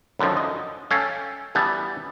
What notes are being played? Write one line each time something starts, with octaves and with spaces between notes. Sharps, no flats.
F#2 D3 D#3 F3
D#5
C#4 A4 C#5 F5 G5
E3 G3 B3 A5